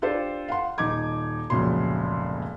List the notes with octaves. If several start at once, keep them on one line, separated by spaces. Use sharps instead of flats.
D4 F4 G4 A4 C5 D5
F5 F#5 C6
D#1 D#4 D6 G#6
F1 C#2 A#2 F#3 C6